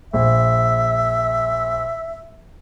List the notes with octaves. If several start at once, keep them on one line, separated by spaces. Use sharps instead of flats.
A#1 E5